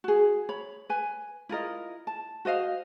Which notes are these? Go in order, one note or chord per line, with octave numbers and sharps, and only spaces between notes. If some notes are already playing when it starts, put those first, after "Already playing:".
F#4 G#4
C#5 B5
B4 G#5
E4 F4 A#4 D#5
A5
F#4 C5 D#5 F5